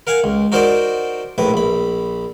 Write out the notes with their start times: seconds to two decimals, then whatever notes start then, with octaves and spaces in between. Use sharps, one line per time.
0.07 A#4 F5 F#5 G#5
0.24 C#2
0.52 D#4 F#4 A#4 C5 D5 D#5
1.38 A#1 A2 B4
1.54 A#1 B5